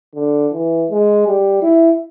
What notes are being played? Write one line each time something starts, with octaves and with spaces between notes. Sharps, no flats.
D3
E3
G#3
G3
E4